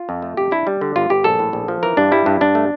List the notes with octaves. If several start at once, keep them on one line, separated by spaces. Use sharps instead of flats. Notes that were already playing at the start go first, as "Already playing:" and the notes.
Already playing: F4
F2
A3
F2 G4
D4 E4
G3
D3
G1 F4
G1 G4
A#1 A4
A2
A#1
F3
E3 A#4
G2 D4
G3 E4
G2
G2 D4
A3